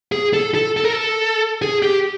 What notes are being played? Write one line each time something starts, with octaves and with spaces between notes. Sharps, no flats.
G#4
A4
A4
A4
A#4
A4
G#4
G4